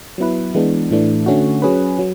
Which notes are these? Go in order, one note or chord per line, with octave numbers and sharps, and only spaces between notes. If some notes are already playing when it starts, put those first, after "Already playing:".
F#3 B3 E4 B4
E3 G#3 B3 D4
A2 E3 A3 D4
D3 A3 C#4 F#4
F#3 C#4 G#4 B4
F#3